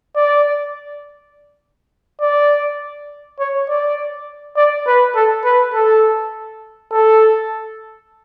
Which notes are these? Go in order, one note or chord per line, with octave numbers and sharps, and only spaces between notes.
D5
D5
C#5
D5
D5
B4
A4
B4
A4
A4